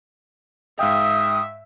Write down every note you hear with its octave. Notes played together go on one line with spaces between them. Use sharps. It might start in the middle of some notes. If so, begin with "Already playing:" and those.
G#2 E5 F5 G5 D#6